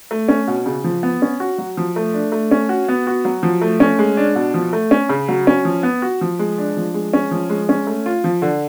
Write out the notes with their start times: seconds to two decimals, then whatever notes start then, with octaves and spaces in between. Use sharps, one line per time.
0.11 A3
0.29 C#4
0.47 B2
0.66 C#3
0.84 F3
1.03 B3
1.22 C#4
1.40 F#4
1.58 F#3
1.77 F3
1.96 A3
2.14 D4
2.32 A3
2.51 C#4
2.69 F#4
2.89 B3
3.07 F#4
3.25 F#3
3.43 F3
3.62 A3
3.80 C#4
3.99 G#3
4.17 D4
4.35 B2
4.54 F3
4.73 A3
4.91 C#4
5.09 C#3
5.29 F#3
5.47 C#4
5.65 F3
5.83 B3
6.02 F#4
6.21 F3
6.39 G#3
6.58 D4
6.77 F3
6.94 G#3
7.14 C#4
7.31 F3
7.50 G#3
7.69 C#4
7.87 A3
8.06 F4
8.24 F3
8.42 D3